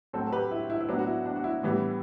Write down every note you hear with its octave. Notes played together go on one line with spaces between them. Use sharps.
A2 F#3 C4 F#4 A4
A4
G4 B4
E4
E4
E4
A2 F#3 B3 D4
F#4
E4
D4
F#4
E4
A2 E3 G3 B3